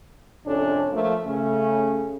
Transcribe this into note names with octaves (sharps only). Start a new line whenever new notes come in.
F2 G#2 C3 C#4 D4 A4
F3 A3 A#3
C#3 A3 C#4